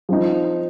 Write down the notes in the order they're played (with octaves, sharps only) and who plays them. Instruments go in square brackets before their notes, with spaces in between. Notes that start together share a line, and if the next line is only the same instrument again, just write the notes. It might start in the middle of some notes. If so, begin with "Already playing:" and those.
[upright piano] F3 C4 D#4